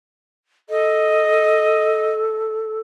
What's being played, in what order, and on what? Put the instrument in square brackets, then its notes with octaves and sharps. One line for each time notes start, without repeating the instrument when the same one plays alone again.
[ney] A4 [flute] D#5